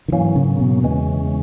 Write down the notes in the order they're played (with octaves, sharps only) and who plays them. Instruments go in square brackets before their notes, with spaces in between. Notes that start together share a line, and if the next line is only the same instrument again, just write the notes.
[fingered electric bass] D#3
[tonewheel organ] G#2 F#3 A#3 C#4 [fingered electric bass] E3
[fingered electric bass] C#3
B2
[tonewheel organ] E2 C#3 E3 G#3 C#4